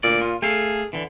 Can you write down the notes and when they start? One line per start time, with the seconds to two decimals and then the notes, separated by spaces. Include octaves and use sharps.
0.03 D2 A#2 D5
0.21 F4
0.42 A3 G#4 A4 F5
0.93 D3 E3